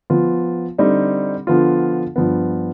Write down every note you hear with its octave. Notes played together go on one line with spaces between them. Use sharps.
F3 B3 F4
D3 G3 C4 D#4
D3 F3 B3 F4
G2 F3 B3